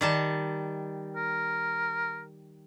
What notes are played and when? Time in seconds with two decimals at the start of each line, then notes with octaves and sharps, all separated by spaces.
0.01 D#3 G3 A5
1.16 A#4